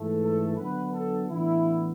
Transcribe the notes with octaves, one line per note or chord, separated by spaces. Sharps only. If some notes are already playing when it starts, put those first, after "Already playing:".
Already playing: G#2 E3 A3
A4
D3 F#3 B3 D4 B4
A4
A2 E3 B3 D4 E4